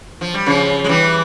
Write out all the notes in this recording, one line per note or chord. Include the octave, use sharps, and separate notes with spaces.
F3
G3
C#3 F3
G#3
E3 G3